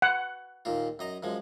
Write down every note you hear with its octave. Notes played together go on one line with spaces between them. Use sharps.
F#5
D#2 A#2 F4
F#2 D#5 A#5
F#2 F3 G#3